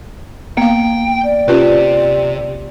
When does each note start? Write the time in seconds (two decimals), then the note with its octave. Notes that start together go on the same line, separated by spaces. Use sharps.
0.57 A#3 B3 F5 G5
1.24 D5
1.48 C3 C#4 F4 G4 B4